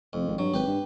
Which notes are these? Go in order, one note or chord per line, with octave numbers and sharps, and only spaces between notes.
F1 F2
G#1
G2 F#3
G#1 G4 B4
G2